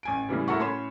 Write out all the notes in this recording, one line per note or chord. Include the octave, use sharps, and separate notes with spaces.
A1 G#5 D7
A2 C#3 E3 G3
E4 F#4 A4 A#4 F#5 C#6
A2 C#4 C#5 B5 C6 E7